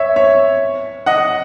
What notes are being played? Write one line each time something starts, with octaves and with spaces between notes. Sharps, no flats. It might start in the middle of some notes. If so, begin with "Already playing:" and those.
Already playing: C#5 E5
C#5 E5
D#5 F#5